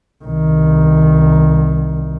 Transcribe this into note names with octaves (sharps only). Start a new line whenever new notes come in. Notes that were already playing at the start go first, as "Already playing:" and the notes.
C2 D#3